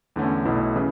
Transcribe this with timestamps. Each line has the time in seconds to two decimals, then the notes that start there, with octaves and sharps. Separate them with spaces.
0.16 E2 D3 A3 C#4
0.45 B1 B2 A3 E4
0.76 C#3 E3